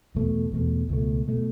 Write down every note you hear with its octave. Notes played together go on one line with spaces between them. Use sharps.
E2 B2 A3
E2 B2 A3
C#2 B2 A3
B2 A3